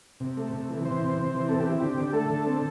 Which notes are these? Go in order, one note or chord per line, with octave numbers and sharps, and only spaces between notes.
C3
A3
C3
E3
E3 C5
C3
C3
E3
C4 A4
G4
C4 E4
D3 G4
D3
A3 A4
D3
C4